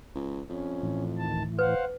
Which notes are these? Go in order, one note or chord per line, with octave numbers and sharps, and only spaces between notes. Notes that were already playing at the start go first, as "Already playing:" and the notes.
C#2
F2 C#4
A2 E3
D2 D#3 A5
B4 C5 F5 F#5